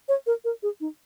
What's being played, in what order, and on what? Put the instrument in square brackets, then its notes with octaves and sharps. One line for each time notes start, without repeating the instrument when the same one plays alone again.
[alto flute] C#5
A#4
A#4
G#4
D#4